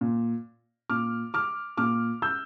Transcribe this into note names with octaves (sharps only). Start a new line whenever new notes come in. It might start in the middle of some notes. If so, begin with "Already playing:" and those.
A#2
A#2 D6 F6
D6 F6
A#2 D6 F6
E6 G6